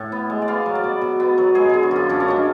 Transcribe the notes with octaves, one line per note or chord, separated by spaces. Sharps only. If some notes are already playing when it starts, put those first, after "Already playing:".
Already playing: A2
B3
G#3
D5
B3 F5
F#3
D5
B2
B2
B3
F#3
G#3 G#4
D3 G#4
F#4
F#2 F4
F#2 D4
C#4
G#3 D4